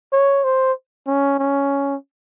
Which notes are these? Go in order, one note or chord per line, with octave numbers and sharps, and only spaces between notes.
C#5
C5
C#4
C#4